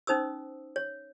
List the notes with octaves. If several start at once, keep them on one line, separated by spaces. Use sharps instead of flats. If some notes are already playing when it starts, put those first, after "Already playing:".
C#4 D#4 C5 D#6 E6
C#5